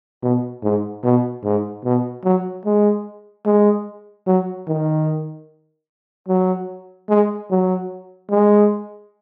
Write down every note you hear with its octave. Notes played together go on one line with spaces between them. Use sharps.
B2
G#2
B2
G#2
B2
F#3
G#3
G#3
F#3
D#3
F#3
G#3
F#3
G#3